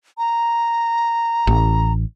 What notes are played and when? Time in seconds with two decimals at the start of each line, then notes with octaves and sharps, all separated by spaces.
0.18 A#5
1.47 A1